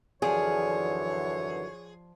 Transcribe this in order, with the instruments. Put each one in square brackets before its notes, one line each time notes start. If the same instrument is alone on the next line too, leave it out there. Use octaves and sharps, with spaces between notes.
[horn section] F#2 D3 E3 [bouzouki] F3 D5 F5 [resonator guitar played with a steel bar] G#4 [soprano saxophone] C#5